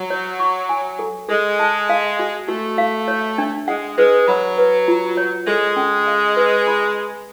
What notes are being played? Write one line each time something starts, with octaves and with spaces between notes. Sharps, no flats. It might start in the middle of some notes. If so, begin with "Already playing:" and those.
Already playing: F#3
C#5
C#6
G#5
A4
G#3 A4
A5
F5
F#4
A3 F#4
F5
C#5
D4
G#3 F#5
G#3 B4
F#3 B5
B4
F4
C#5
G#3 A4
C#4
F5
B4
B5